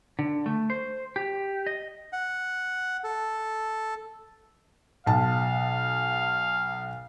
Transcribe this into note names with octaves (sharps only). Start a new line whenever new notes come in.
D3
A3
C5
G4
D#5
F#5
A4
B1 F5 A5